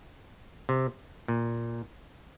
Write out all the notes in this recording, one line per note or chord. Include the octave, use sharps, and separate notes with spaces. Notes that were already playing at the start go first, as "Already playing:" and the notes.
C3
A#2